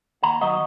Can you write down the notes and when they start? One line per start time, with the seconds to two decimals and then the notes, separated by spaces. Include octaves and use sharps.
0.23 D#2 F#5 A#5
0.41 D#3 F#3 B3 D#5 F#5